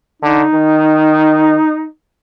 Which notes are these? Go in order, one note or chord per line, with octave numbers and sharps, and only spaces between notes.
D3 D#4
D#3